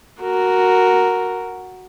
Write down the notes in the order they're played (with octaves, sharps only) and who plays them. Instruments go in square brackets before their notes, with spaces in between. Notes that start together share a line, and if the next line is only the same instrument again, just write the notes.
[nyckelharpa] F#4 A#4